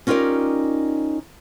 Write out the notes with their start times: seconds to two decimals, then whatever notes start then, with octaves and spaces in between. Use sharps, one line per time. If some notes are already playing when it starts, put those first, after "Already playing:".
0.07 C#4 D#4 F4 G4 A#4 D5